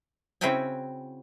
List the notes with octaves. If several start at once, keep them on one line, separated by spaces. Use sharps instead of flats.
C#3 C4 E4 F#4 G5 G#5